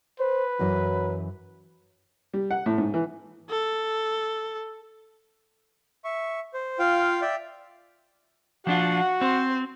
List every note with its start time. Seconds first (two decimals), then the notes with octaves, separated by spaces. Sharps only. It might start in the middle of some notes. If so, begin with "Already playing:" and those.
0.20 B4 C5
0.59 F#2 E3 F#3 D#5
2.34 G3
2.51 F#5
2.66 A2
2.78 G#2
2.94 E3
3.50 A4
6.04 E5 C#6
6.54 C5
6.79 F4 F5 G5
7.22 D5 E5 G5
8.67 F3 D4 F4 F#4 F#5
9.21 C4 C5